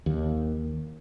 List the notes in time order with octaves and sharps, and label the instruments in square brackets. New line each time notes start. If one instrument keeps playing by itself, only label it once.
[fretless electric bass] D#2